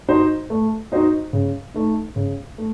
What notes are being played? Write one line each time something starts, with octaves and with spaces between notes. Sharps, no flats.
D#4 F#4 C5 D#5
A3
D#4 F#4 C5 D#5
C#3
A3 D#4
C#3
A3